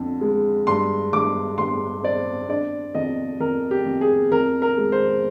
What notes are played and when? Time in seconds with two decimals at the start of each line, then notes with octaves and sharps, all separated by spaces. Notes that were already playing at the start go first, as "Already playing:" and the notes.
Already playing: F2 D3
0.21 G#3
0.67 G2 C6
1.13 G2 D6
1.58 G2 C6
2.03 C4 D5
2.49 D4 D5
2.95 F2 D#5
3.40 F2 A#4
3.71 G4
3.86 F2
4.01 G#4
4.31 F2 A#4
4.62 A#4
4.77 G#3
4.92 C5